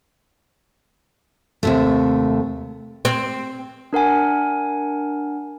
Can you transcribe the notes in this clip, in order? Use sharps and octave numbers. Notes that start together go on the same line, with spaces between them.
D#2 C3 A3
C4
D4 A#4 F#5 G#5